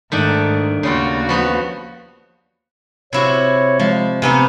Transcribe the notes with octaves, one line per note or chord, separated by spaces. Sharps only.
G#2 D#3 A3 D4
D#2 C#3 G3 F4 F#4
F3 B3 B4
C3 E4 F#4 C#5
F3 G#3
C3 B3 D#4 G#5